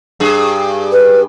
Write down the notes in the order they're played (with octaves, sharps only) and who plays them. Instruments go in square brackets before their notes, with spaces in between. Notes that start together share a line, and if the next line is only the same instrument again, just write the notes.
[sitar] G2 G#4
[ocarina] B4